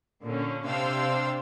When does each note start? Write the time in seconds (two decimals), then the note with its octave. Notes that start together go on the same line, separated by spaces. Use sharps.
0.23 A#2 D3 C#4
0.66 C3 D4 C5 F5 E6